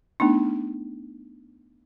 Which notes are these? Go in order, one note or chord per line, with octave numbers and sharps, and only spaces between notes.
A3 B3 D4 D#4